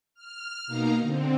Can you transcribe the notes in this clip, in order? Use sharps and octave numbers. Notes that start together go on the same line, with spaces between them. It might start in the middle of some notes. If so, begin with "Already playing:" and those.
F6
B2 A#3 D#4 F5 A#5
D3 C4